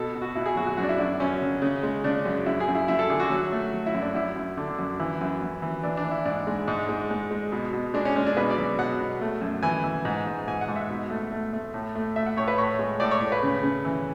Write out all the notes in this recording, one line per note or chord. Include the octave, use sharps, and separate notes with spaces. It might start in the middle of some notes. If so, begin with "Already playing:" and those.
Already playing: B2 A4
B2
F#4
B2 E4
G#4
F#3 F#4
F#4
F#2 F#4
D4
E4
F#2 D4
F#2 C#4
C#3
C#3
G#3
C#3 D4
F#2
F#2 E4
G#4
F#2
E4
F#2 E4
A4
D3 G#4
F#4
F#3
A3
F#3
E4
F#2
D4
F#2 E4
F#2
D3
F#2
E3 E4
F#2
F#2
E3
E3 D4
D4
E3
E4
G#2 D4
G#3
G#2
G#3
G#3
G#3
B2
B2
G#3 D4
C#4
G#3 C#4
D4
B2 B4
D5
F#3
B2 F#5
B2
A3
F#2
E3 G#5
E3
G#2
G#2
G#2 G#5
F#5
G#2
E5
B2
A3
A3
A3
A2
A3
A3 E5
F#5
A2 C#5
B4
A2 C#5
G#3
A2 D5
C#5
A2
B4
C#3
C#3
E3